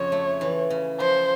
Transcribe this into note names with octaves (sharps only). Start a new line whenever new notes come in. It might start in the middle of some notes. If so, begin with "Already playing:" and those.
Already playing: F2 C#3 C#5
A3
E3
C#3
F3 C5